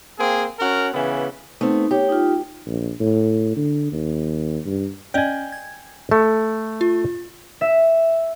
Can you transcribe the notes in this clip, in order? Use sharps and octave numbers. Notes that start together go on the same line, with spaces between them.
A#3 C4 G#4
C#4 F#4 A#4
C#3 E3 B3
A3 B3 C4 D#4
G4 C#5
D#4 F4
A#1
A2
D3
D#2
G2
C#4 D5 D#5 G5 G#5
G#6
A3 A4
F4
E5